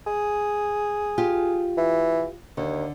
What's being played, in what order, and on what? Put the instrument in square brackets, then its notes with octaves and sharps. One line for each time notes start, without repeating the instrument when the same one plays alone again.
[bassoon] G#4
[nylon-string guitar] F4 G4
[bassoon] E3
[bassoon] D#2 [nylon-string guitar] D3